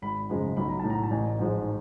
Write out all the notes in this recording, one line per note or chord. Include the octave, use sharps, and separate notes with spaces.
G#1 B5
F#2 C#3 F3 G#3
B1 B5
A#5
A2 F#3 A5
A#5
A5
A1 G#5
G#2 F3 G#3